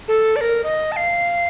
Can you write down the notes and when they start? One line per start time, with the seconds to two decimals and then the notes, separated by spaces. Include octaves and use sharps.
0.08 A4
0.36 D5
0.41 A#4
0.64 D#5
0.92 A5
0.96 F5